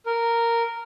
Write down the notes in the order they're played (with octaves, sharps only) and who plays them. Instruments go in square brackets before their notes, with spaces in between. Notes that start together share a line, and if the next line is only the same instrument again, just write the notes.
[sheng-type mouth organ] A#4